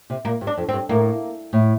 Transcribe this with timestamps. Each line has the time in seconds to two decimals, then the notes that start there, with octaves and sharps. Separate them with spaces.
0.10 C3
0.25 A#2 A#3
0.41 G2
0.47 D4
0.57 F2
0.69 C4
0.73 G2
0.89 A2 A#3
1.53 A2